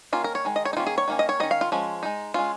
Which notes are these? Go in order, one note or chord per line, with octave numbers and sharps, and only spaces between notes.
D#3 A#3 C#4 F4
A#4
C#5
D#3 G#3
D#5
C#5
D#4
D#3 A#3 C#4 F4
G#4
C#5
D#3 A#3 C#4
D#5
C#5
D#3 C#4 D#5
F5
F4
F3 G#3 C#4
G#3 D#4
G#3 C#4 F4